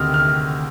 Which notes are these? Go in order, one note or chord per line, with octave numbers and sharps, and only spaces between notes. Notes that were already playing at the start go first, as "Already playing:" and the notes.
Already playing: D2 C3 D#3 D#6 F6
F6